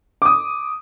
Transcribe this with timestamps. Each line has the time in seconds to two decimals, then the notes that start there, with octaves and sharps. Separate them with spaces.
0.22 D6 D#6